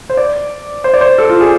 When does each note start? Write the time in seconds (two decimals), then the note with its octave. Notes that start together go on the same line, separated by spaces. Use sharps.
0.10 C5
0.17 D5
0.84 C5
0.94 D5
1.01 C5
1.18 A4
1.30 F4
1.41 G#4